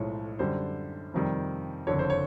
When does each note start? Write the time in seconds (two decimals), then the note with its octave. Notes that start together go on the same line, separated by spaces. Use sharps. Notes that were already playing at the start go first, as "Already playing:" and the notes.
Already playing: B1 A2 F3 G#3 C#5
0.39 F#2 D3 G3 C5
1.14 F2 C3 D#3 G3
1.87 F#1 F2 D3 C#5
1.99 C5
2.10 C#5